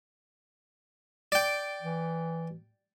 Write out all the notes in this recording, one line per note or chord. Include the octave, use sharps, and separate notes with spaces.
D5 G5
E3